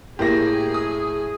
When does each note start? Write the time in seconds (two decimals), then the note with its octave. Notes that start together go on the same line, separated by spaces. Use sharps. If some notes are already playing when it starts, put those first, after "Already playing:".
0.19 A2 A#3 G4 G#4 A#6
0.74 D#6